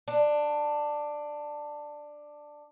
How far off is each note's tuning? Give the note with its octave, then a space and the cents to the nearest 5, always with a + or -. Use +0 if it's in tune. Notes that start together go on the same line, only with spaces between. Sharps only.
D4 +10